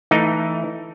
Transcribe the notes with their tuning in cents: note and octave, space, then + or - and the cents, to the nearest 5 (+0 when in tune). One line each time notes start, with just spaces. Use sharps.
E3 +0 A3 +15 D#4 +5